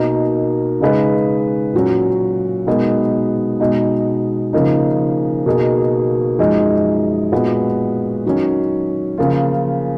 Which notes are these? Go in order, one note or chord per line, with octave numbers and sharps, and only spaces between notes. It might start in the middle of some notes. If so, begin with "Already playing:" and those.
Already playing: B2 A#3 D#4 A#4
C#3 G#3 D#4 G#4 B4
A#2 F#3 C#4
B2 G#3 B3 D#4 A#4
B2 G#3 B3 D#4
C#3 F3 A#3 D#4
B2 A#3 D#4 G#4
F#2 F3 G#3 D#4
A#2 G#3 B3 F#4 B4
D#3 F#3 C#4
C#3 F3 A#3 F4